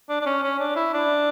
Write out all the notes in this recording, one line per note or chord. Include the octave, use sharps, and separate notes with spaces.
D4
D4
C#4
C#4
D4
E4
D4